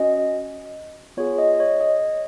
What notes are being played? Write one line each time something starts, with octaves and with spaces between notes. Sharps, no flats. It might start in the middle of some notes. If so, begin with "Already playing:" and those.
Already playing: C#4 F#4 D#5
B3 F4 G#4 C#5
D#5
C#5
D#5